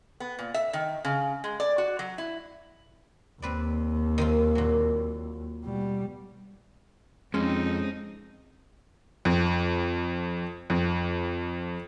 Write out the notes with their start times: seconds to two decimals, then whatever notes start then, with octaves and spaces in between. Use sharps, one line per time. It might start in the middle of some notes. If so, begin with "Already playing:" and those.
0.20 B3
0.39 A#2
0.54 E5
0.73 D#3
1.05 C#3
1.44 G#3
1.60 D5
1.78 F#4
1.99 F#3
2.18 E4
3.42 D#2 C4 B4 D5
4.18 D#3 C4 F4
4.55 A#2 F#3
5.64 B2 G3
7.34 F2 G#3 C4 C#4 D#4
9.25 F2
10.70 F2